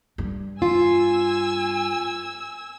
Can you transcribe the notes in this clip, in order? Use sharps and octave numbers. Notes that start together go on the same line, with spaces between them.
G2
F4 G#5 E6